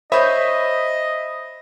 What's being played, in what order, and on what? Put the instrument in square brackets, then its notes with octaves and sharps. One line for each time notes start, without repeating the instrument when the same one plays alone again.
[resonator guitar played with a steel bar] C5 C#5 [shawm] D#5 [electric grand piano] E5 B5 D#6